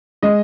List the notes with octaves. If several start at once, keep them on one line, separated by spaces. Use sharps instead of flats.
G#3 D#5